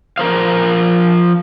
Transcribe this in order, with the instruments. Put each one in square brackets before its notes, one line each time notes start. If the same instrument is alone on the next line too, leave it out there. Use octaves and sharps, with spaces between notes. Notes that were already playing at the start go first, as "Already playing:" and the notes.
[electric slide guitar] F3 A#4 C5 F5